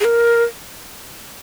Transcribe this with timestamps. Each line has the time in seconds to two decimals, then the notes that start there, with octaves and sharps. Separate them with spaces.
0.01 G#4
0.04 A#4